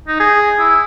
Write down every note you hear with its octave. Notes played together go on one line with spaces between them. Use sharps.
D#4
G#4
E4